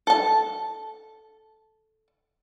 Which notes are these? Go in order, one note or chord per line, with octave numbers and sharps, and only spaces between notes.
A4 A5